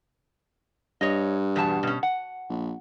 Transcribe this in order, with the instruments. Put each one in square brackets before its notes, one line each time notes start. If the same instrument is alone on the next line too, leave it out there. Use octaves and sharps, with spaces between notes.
[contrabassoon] G2 [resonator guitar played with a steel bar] C#5 D#5
[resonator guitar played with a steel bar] E2 B2 A5
B2 C#4
F#5
[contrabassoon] A#1